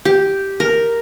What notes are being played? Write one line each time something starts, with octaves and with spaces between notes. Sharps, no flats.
G4
A#4